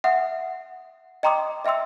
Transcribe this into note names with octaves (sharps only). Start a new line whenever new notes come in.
E5 F#5 D#6
D#5 G5 A#5 C6 D6 D#6
D#5 E5 G5 C6 E6